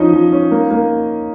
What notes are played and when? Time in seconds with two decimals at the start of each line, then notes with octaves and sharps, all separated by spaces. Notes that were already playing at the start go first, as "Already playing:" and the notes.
Already playing: F3 C#4 D#4 D#5
0.13 F3
0.32 C#4
0.51 A#3
0.70 A#3